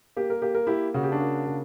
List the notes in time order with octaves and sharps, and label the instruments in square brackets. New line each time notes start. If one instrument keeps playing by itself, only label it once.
[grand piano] A#3 G4
A#4
A#3 G4
A#4
A#3 E4 G4
C#3 F#4
G4
D4 F#4
A#3
C#3